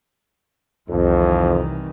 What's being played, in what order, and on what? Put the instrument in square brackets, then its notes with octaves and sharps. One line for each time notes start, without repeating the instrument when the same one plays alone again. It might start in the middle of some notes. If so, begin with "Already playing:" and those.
[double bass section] C2 D#3 E3 [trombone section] F2